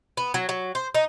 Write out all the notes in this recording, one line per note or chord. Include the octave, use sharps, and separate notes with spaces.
B3
F#3
F#3
C5
D#4